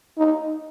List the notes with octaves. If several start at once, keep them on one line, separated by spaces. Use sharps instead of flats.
D#4